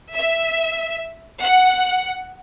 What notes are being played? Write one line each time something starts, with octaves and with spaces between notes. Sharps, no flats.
E5
F#5